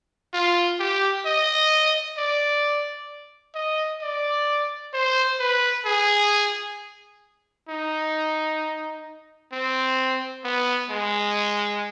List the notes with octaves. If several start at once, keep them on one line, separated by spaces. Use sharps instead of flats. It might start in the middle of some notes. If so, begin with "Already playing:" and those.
F4
G4
D#5
D5
D#5
D5
C5
B4
G#4
D#4
C4
B3
G#3